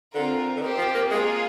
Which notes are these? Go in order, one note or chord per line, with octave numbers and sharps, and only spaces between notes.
D3 C4 F4 A#4
D3
D#3 C4 G4 C5
F3
A#3
G#3 A#3 F4 G#4